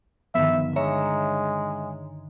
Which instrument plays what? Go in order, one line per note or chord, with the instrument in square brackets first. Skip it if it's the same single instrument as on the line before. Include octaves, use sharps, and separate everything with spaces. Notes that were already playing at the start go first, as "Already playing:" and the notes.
[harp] G2 D3 D#3 [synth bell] F3 B3 [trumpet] E5
[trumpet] G#3 [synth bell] C#5 E5 A#5